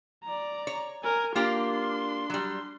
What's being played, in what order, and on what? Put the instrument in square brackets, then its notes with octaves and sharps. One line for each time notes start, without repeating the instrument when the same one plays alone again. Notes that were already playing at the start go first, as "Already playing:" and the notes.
[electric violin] D5 A#5
[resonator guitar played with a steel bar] C#5
[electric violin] A#4 G#5
[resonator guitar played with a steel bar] A#3 F4 G4 [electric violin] D4 C6
[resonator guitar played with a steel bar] F#3 G3